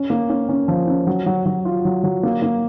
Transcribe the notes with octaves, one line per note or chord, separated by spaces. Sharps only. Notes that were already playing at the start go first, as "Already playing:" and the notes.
Already playing: C#4
A#3
C#4
C#4
F3
C#4
F#3
F#3
F#3
F4
F#3
F#3
A#3
A#3